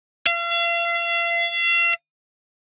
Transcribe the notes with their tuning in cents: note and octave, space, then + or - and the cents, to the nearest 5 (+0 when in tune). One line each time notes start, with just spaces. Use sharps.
F5 -40